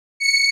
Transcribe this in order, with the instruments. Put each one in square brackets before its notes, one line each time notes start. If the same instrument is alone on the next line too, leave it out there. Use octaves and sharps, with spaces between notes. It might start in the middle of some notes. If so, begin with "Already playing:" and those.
[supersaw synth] C#7